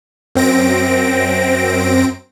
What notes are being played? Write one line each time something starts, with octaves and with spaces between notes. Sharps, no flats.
F#2 C4 A#6 D7